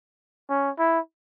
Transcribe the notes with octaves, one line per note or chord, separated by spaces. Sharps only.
C#4
E4